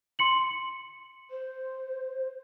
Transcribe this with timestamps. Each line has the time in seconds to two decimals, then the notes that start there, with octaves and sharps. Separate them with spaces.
0.19 C6 C#7 F#7
1.31 C5